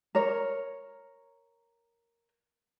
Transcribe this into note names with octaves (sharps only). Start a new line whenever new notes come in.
A#4 C#5